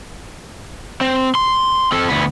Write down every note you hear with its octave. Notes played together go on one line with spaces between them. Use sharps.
C4
C6
C4 A4
D2 B3